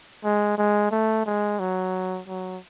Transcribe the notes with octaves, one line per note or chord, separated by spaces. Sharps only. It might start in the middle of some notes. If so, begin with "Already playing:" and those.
G#3
G#3
A3
G#3
F#3
F#3